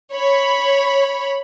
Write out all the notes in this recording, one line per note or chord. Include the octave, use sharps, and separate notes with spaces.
C#5 B5